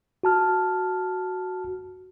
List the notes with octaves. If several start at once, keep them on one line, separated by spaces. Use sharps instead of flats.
F#4 A5 F6